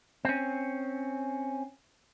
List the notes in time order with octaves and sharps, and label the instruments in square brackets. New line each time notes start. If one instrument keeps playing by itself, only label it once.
[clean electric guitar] C4 C#4